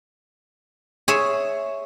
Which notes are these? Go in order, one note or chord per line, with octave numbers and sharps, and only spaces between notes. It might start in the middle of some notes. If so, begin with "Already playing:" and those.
G#4 C#5 E5